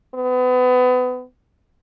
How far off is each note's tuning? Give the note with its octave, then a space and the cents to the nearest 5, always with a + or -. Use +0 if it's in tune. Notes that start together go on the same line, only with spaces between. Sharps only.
B3 +30